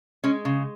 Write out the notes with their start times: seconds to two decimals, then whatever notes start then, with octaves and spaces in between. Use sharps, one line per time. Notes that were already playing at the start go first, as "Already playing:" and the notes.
0.24 G#3 C#4
0.45 C#3